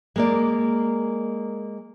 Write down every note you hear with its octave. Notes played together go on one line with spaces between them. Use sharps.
G#3 A#3 D5